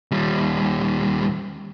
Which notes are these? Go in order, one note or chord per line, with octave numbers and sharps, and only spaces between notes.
D#2 G3